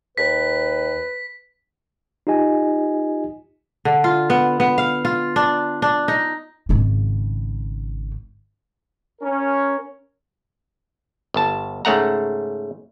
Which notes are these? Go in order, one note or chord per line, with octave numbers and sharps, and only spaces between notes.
D#2 B4 B6
D#4 F4 G4 D#5 G#5
D3
F4
B3
B3
F5
F4
D4
D4
D#4
G#1 C#3
C#4 A#4
G1 A5
G#2 C#3 A3 F#5 A#5